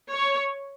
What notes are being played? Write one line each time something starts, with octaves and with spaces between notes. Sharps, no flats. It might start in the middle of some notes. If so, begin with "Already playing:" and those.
C#5